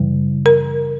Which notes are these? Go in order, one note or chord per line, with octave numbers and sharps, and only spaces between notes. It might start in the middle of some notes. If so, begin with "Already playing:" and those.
Already playing: F#2 C#3 E3 G3
A#4